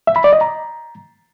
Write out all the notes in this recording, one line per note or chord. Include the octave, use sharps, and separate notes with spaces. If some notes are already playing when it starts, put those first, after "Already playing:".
E5
B5
D5
D#5
A#5